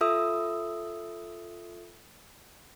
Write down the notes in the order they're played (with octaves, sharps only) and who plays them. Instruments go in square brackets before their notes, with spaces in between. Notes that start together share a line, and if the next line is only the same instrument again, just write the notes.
[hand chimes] F4 A4 E5 D#6 E6